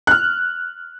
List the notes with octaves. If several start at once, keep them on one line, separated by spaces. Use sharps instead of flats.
F6 F#6